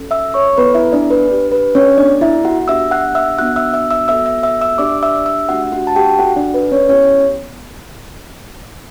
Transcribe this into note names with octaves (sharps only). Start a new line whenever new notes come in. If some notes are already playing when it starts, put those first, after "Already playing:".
Already playing: C#4 F#4 A4
E5 E6
C#5 C#6
B3 E4 A4 B4 B5
E4 E5
D4 D5
B4
D4 G4
B4
C#4 C#5
B3 D4 F#4 A4 D5
E4 E5
F#4 F#5
B3 D4 G4 E5 E6
F#5 F#6
E5 E6
B3 D4 F#4 F#5 F#6
E5 E6
E5 E6
E5 E6
B3 F#4 A4 E5 E6
E5 E6
E5 E6
E5 E6
D4 G4 D5 D6
E5 E6
E5 E6
A3 D4 F#4 G4 F#5
F#4 F#5
A5
G4 G5
D4 F#4 A4 F#5
D4 D5
B4
C#4 C#5
B3 C#4 E4 G4 C#5